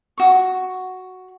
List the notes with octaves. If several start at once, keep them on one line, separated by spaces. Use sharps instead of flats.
F#4 C#6